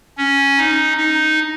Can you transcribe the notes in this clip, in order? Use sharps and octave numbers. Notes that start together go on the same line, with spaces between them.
C#4
D#4
D#4